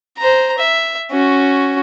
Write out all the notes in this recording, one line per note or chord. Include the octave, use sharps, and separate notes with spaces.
C5 A#5
E5
C#4 F#4